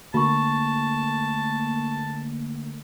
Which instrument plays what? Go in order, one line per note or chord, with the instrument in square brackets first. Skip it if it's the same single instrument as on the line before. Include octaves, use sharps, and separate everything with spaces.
[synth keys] D3 A3 A#3 [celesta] F#4 C#6 [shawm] A5